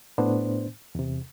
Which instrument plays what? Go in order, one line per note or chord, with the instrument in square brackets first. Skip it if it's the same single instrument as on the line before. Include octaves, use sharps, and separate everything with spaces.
[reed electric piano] A2 B3 D4 C5
E2 C3